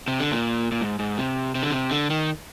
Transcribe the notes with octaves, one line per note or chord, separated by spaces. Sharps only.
C3
D3
A#2
A#2
G#2
G#2
C3
C3
D3
C3
D3
D#3